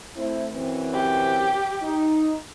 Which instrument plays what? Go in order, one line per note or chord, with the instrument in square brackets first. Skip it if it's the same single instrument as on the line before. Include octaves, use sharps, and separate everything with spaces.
[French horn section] A3 C4 E4
F#2 E3 C4
[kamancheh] G4
[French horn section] D#4